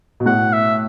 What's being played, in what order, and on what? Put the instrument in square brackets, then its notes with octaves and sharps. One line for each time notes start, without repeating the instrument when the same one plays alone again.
[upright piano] B2
[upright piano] A2 [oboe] F#5
[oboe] E5